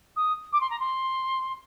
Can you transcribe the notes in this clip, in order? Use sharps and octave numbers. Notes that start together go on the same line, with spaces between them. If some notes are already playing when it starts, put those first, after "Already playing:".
D#6
D6
C6
A#5
C6